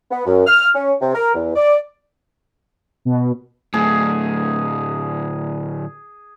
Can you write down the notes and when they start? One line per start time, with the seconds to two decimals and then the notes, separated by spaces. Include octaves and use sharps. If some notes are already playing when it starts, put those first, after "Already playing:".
0.11 B3
0.26 F#2
0.47 F6
0.75 C#4
1.01 C3
1.15 A#4
1.34 E2
1.55 D5
3.05 B2
3.74 D2 A2 G#4